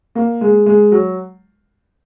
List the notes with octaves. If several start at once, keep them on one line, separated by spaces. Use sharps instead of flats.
A#3
G#3
G#3
F#3